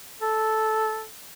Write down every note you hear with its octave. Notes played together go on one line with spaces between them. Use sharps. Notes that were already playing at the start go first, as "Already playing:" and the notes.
A4